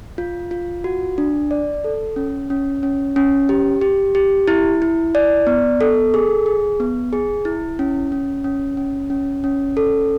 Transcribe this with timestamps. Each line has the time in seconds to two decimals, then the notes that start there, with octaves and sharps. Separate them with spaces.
0.18 F4
0.51 F4
0.84 F#4
1.18 D4
1.51 D5
1.84 A4
2.16 C#4
2.50 C#4
2.83 C#4
3.16 C#4
3.49 G4
3.81 G4
4.15 G4
4.48 E4
4.82 E4
5.15 D5
5.47 B3
5.81 A4
6.14 G#4
6.46 G#4
6.80 B3
7.13 G#4
7.45 E4
7.79 C#4
8.12 C#4
8.44 C#4
8.77 C#4
9.10 C#4
9.44 C#4
9.77 A4